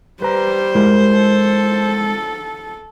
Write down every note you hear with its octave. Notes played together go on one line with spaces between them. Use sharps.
G3 B4 C5 A#5
G#3 E4 A#4
A4